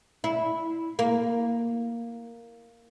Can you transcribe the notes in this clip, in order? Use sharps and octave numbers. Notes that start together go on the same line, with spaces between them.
E4
A#3